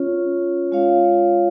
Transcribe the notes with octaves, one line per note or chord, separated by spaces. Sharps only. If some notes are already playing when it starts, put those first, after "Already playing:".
Already playing: C#4 F4 C#5
G#3 F4 C#5 F5